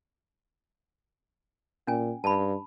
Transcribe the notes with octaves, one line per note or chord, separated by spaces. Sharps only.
A#2 C#4 G#5
G2 A5 B5